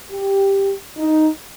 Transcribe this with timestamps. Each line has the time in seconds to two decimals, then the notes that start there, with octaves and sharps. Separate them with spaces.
0.11 G4
0.97 D#4